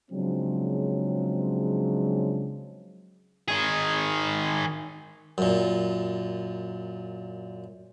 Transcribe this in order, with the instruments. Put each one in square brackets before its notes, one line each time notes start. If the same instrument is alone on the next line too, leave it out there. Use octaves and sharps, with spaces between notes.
[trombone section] C#3 F3 F#3 G#3 C4 D4
[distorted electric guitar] D#3 G#4
[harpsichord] F#2 A#2